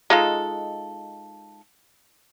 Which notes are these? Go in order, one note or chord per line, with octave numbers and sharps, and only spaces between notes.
G#3 D#4 F4 A4